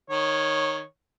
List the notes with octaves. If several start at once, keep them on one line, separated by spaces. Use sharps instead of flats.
D#3 C#5